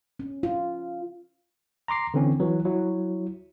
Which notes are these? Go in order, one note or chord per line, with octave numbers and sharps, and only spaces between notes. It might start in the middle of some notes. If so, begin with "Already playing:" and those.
C#4
F4
A#5 C6 D6 C7
D3 E3 C4 C#4
E3 F#3
F#3 E4